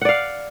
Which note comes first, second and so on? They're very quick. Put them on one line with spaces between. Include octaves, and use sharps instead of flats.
F#5 D5 F5